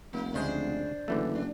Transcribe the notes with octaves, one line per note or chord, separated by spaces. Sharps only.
F1 A#3
D2 C#3 G#3 D4 C5
F#1 D3 E3 A3
D4